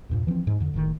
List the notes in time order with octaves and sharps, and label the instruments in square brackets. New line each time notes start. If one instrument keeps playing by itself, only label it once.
[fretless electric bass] E2 G2 A#2
E3 F3 A#3 C4
G#2
F2 D3
F#1 A2 C3 D#3